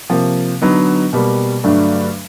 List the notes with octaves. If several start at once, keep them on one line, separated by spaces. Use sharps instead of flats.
C3 F3 A#3
D3 F#3 B3 D#4
B2 G3 A#3
G2 D3 F#3 A3 D4